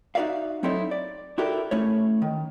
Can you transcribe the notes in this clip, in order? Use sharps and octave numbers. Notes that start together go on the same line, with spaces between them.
D#4 F#4 A4 D5 E5 F5
F#3 C4 D#4 E4 A4 C#5
D5
E4 F#4 G4 A4 A#4
A3 C#4 E4 C#5
D#3